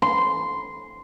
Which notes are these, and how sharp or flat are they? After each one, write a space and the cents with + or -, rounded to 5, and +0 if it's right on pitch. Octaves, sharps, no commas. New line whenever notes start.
C6 -10